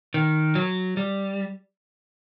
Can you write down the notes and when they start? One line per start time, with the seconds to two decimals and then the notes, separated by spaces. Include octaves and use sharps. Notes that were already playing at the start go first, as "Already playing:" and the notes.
0.14 D#3
0.55 F#3
0.97 G3